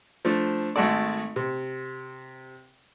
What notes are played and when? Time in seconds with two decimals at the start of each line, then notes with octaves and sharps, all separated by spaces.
0.25 F3 A3 D4
0.76 G#1 G#3 A3 F#4 A4 D5
1.36 C3